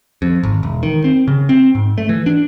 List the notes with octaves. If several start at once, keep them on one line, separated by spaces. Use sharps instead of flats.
F2
G#1
E1
D#3
C4
C#3
C4
G#2
A3
E3
D4